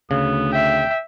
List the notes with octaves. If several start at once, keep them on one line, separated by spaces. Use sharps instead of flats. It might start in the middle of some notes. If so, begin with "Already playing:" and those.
D2 C#3 B3
E5 G5